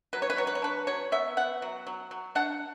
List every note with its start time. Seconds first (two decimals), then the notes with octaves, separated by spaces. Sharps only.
0.13 F#3 B4
0.22 C#5
0.30 B4
0.37 F#3 C#5
0.47 B4
0.55 C#5
0.62 D4 B4
0.87 F#3 C#5
1.12 B3 E5
1.37 B3 F#5
1.62 F#3
1.87 F#3
2.11 F#3
2.35 D4 F#5